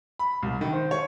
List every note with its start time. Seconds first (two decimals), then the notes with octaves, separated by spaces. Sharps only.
0.19 B5
0.43 C2
0.61 D#3
0.73 C5
0.91 C#5